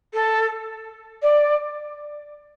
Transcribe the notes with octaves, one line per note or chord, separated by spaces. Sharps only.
A4
D5